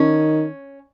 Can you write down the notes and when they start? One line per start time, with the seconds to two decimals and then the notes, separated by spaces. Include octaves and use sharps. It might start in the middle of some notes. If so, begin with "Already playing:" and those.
Already playing: D#3 C#4